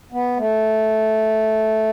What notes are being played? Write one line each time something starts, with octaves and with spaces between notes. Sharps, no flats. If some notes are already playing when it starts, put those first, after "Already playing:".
B3
A3